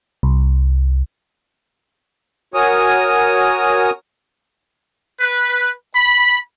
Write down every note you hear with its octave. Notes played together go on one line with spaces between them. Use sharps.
C2
F#4 A#4 C#5 G#5 D#6
B4
B5